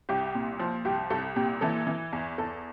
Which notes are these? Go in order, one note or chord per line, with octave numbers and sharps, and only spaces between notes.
C2 G4
A#2
F3
C2 G4
C2 A4
A#2 G4
E3 A4
E3
E2
E2 A4